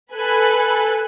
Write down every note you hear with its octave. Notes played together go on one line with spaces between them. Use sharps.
A4 B4 G#5 F#6